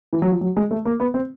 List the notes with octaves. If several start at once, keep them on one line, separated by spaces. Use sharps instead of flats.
E3
F#3
F3
F#3
G#3
A3
A#3
B3
C4